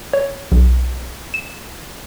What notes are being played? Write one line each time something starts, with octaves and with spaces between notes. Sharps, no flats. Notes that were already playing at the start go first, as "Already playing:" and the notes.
C#5
B1
E7